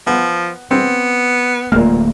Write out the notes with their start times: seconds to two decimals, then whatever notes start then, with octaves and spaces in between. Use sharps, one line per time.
0.07 F3 B3
0.71 B3 C4
1.72 D1 A#2 A3 A#3 F6